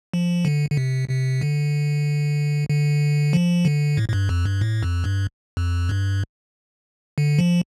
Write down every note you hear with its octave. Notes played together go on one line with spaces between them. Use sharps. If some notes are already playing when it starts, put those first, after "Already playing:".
F3
D3
D3
C3
C3
D3
D3
F3
D3
A2
A2
G2
F2
G2
A2
F2
G2
F2
G2
D3
F3